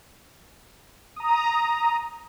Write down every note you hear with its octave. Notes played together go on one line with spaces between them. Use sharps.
A#5 D#6